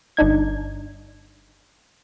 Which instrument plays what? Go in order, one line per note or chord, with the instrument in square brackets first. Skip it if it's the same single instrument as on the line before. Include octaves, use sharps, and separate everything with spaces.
[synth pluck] G1 D4 D#4 G#6